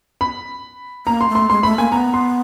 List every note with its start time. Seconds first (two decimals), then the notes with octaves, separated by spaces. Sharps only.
0.21 B5
1.07 A#3 A#5
1.21 C6
1.29 A3
1.35 C6
1.49 G#3 C6
1.63 A3 B5
1.78 A#3 G#5
1.92 B3 A#5
2.14 C6